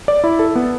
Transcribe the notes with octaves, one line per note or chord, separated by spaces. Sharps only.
D5
E4
A4
B3